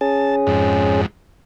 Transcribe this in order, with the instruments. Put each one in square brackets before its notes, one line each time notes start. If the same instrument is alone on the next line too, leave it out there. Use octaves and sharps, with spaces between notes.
[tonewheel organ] C#4 G#4 [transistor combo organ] A5
[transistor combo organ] F2 G#2